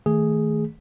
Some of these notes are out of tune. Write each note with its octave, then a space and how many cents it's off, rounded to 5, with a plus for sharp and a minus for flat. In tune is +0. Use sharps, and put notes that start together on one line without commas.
D#3 +25 A3 +0 G#4 +0